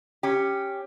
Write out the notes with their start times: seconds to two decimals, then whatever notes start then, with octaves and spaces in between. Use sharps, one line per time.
0.23 C#4 G4